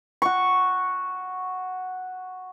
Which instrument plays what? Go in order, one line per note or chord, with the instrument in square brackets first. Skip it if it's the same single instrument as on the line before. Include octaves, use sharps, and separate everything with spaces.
[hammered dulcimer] F#4 C#6